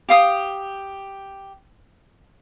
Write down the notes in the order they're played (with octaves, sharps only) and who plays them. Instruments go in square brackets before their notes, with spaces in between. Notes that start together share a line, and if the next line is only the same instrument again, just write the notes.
[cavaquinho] G4 F5 D#6